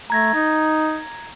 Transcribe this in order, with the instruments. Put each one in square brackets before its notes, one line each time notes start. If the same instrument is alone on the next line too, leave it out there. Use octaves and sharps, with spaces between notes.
[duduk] A3 [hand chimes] A#5 G#6 A#6
[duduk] D#4